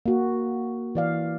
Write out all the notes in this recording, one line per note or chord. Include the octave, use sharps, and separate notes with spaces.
A#3 F#4
E3 D5 F5